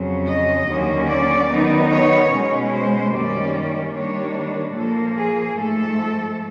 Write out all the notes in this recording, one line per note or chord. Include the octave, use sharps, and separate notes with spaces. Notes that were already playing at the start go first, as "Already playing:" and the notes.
Already playing: F2 C#3 F#3
D#5
D#2 D3 F#3 A#3 C#4
D5
D#3 F#3 B3 D#4
C#5
B2 G#3 C#4
C5
F#2 D#3 G3 A#3 C#4 D5
D#3 G3 A#3 D4 C#5
A#2 F3 A#3 A4
G#4
G#2 F3 A3 A4